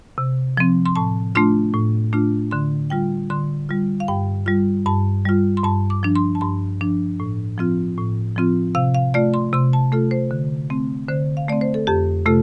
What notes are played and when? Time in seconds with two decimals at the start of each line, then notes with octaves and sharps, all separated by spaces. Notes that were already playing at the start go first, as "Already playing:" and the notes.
0.18 C3
0.57 F3 C4
0.86 C6
0.96 A2 A5
1.35 A3 D4 F4 C6
1.74 A2
2.13 A3 D4 F4
2.51 D3 C6
2.90 G3 F4 G5
3.30 D3 C6
3.69 G3 F4
4.00 F5
4.08 G2 G5
4.46 G3 F4
4.86 G2 A5
5.25 G3 F4
5.57 C6
5.64 G2 A5
5.90 D6
6.03 F3 D4
6.16 C6
6.35 A5
6.41 G2 C6
6.81 F3 D4
7.20 A2
7.58 F3 C4 F4
7.98 A2
8.36 F3 C4 F4
8.75 C3 F5
8.94 F5
9.14 A3 F4 D5
9.34 C6
9.53 C3 C6
9.73 A5
9.92 A3 F4 A4
10.11 C5
10.31 D3
10.70 A3 C4
11.09 D3 C5
11.37 F5
11.49 A3 C4 D5
11.61 C5
11.74 A4
11.87 F2 G4
12.26 C3 A3 F4 A4